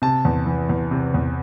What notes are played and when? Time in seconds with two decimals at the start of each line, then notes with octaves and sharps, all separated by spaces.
0.02 C3 A5
0.25 E2
0.46 E3
0.69 E2
0.91 C3
1.14 E2